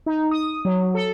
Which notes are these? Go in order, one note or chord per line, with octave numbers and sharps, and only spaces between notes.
D#4
D#6
F#3
A4